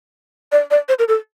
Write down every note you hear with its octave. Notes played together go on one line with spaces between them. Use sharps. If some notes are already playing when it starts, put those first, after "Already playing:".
D5
D5
C5
A#4
A4